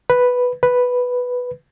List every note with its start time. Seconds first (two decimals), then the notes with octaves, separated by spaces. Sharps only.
0.10 B4
0.63 B4